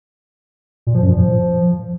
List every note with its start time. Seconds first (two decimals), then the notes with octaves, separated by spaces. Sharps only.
0.87 A#2
0.94 F3
1.02 F#2
1.10 A#2
1.18 F3